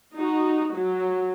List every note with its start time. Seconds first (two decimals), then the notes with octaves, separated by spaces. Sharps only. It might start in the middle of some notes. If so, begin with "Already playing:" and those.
0.16 D#4 F#4
0.76 F#3